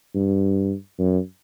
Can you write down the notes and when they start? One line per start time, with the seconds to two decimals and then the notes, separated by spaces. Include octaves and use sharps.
0.15 G2
0.99 F#2